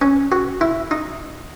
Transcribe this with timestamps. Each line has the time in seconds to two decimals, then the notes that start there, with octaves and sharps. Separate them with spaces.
0.02 C#4
0.32 F#4
0.61 E4
0.91 D#4